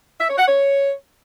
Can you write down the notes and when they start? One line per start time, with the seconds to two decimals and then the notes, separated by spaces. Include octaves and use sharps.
0.19 E5
0.29 C#5
0.38 F#5
0.47 C#5